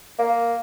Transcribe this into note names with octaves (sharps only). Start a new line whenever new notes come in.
A#3